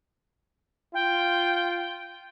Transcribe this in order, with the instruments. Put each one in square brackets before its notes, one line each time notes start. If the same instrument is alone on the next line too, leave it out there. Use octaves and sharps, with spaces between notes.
[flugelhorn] F4 [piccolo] G5